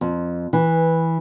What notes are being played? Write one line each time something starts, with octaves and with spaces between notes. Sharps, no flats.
F2
E3